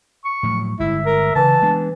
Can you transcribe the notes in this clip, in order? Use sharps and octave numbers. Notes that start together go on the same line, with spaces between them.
C#6
A2 F3 F#3
G1 G#3 E4 E5
A#4
C#3 E3 A5
G#3 B3 D4